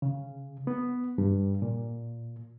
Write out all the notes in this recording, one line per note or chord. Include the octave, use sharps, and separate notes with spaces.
C#3
B3
G2
A#2